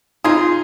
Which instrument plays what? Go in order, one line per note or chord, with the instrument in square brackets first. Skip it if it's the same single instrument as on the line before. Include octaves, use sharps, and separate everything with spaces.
[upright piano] D#4 [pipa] F4 G#4